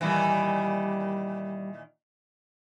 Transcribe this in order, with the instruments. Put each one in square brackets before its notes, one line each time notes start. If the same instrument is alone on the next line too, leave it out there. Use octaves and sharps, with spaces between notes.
[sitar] A#2 D#3 E3 [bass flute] G3